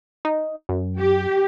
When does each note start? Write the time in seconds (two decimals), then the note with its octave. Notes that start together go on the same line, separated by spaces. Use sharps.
0.25 D#4
0.69 F#2
0.98 G4